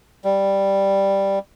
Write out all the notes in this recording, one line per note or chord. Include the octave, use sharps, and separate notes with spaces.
G3